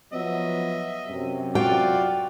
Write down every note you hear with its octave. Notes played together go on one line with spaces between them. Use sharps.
F3 F#3 B3 D#5 E5
F#2 C3
F4 F#4 D5 F5 G5